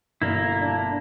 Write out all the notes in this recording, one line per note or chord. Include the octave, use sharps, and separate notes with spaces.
G1 B2 A#3 E4 D5
D4